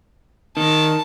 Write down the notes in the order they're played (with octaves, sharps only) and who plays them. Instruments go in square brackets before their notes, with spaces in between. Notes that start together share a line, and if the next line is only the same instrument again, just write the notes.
[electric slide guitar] D#3 [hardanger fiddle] A5